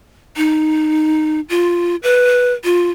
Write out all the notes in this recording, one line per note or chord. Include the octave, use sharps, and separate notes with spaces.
D#4
F4
B4
F4